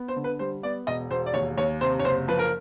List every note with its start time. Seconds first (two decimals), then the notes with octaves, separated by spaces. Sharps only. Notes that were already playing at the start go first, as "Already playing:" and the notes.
Already playing: B3
0.08 C5
0.16 D3
0.24 B4
0.39 G3 C5
0.63 B3 D5
0.87 E1 D#5
1.10 E1 C5
1.26 D5
1.34 D#2 C#5
1.57 D#2 C#5
1.81 C3 C5
1.99 C#5
2.05 F#1 C5
2.28 F3 B4
2.39 A#4